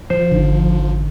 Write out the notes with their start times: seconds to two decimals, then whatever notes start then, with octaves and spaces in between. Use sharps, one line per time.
0.10 F3 C5
0.32 G#1 D3 D#4